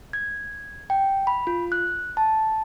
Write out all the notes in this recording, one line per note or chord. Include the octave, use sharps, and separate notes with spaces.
G#6
G5
B5
F4
F#6
A5